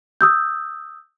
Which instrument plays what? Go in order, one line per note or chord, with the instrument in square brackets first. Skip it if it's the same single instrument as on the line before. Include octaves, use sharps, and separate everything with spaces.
[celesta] D#6 E6 G6